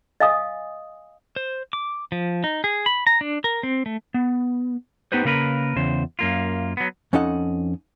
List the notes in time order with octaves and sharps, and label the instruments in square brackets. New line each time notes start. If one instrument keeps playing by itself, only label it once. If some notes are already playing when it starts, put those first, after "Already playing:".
[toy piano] D#5 F5 G#5 D#6
[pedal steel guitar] C5
D6
F3
D#4
G#4
B5
A#5
D4
A#4
C4
A3
[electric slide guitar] B3
B3 D#4 G4 B4 C5
C#3 A#3 A#4 B4
E2 C#3 C5
F#2 A#3 F4
F#3 B3
[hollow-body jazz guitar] F2 C#4 D#4 A4 D#5 F#5